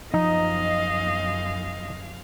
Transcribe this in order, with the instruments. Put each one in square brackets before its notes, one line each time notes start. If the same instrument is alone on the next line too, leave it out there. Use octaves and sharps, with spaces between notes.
[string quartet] F#2 F5 [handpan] F3 [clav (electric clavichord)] D#4 [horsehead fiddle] D#5